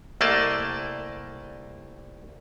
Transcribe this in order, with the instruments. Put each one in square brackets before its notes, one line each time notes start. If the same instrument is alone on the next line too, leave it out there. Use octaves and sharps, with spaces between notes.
[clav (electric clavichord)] C2 A3 A#3 D5 D#5 A5